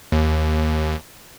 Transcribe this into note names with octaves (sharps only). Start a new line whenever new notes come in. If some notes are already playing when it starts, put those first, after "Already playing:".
D#2